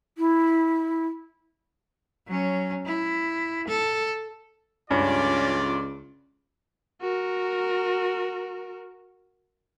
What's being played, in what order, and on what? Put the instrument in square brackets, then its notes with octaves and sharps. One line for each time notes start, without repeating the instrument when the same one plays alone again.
[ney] E4
[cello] F#3 C#4
E4
A4
[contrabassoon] C#2 [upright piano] G2 [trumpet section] A3 F4 D5 [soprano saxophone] C#4
[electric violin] F#4 A#4